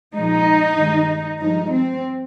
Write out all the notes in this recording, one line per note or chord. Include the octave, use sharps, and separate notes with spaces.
A#2 F3 G#3 D#4
G2 D#3 G#3
G2 F3 G#3 D#4
C4